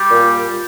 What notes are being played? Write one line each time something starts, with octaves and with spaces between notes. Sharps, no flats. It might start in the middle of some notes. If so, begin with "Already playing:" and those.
Already playing: G3 G4
A#2